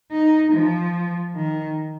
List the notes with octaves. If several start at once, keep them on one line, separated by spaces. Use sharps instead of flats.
D#4
F3
D#3